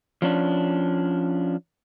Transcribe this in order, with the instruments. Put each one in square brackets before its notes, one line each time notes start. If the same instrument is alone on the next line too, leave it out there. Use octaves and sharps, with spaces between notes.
[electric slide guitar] F3 C#4 D4